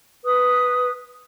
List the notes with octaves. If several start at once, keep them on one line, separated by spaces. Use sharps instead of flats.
B4 D#6